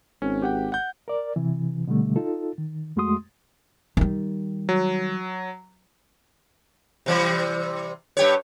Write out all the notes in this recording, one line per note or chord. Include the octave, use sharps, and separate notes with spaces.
G#1 C#4
G4 F#5 G5
F#5 G6
A#4 D5
C3 E3
B2 D3 G3 A3
D#4 F4 A4
D#3
F2 G#3 A3 F#4 C6 D#6
D#3 G3
F#3
C3 E3 G3
G2 G4 C#5